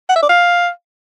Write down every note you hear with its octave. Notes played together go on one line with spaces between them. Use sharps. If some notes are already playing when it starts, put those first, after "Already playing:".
F#5
E5
D5
F5